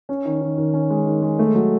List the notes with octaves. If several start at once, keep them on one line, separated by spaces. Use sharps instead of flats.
C#4
D#3
D#3
D#3
C#4
G#3
D#3
G#3
A3
F#3